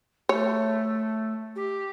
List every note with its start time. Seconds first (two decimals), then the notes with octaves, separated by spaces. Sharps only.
0.29 A3 C#5
1.56 G4